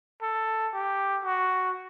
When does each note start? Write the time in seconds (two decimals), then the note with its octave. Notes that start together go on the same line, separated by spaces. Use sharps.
0.22 A4
0.74 G4
1.25 F#4